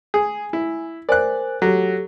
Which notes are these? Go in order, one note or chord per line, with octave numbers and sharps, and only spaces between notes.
G#4 G#5
E4
A#4 C5 D5 G#5 F#6
F#3 G4 A4